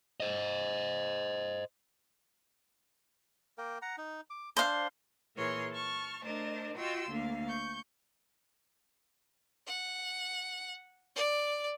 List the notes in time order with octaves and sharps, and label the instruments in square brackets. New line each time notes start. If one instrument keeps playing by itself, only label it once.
[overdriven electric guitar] C5 D#5
[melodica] A#3 A#4 G5
F#5 A#5
D#4
D6
[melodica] D4 [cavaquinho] C5 F5
[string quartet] A#2 E3 G#4 A#4 C#5 C6
A5 C#6 F6
A3 D4 A#4 C5 D#5 A5
F4 F#4 D#5 G5 C6 E6
D2 D3 A#3 F5
C#6 G6
[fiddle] F#5
D5